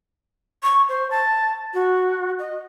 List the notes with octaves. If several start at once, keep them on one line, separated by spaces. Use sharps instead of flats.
C#6
C5
A5
F#4
D#5